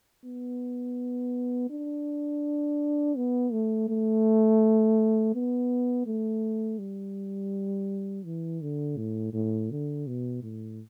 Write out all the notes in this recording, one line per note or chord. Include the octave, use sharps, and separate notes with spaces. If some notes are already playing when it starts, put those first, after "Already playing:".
B3
D4
B3
A3
A3
B3
A3
G3
E3
D3
A2
A2
D3
B2
A2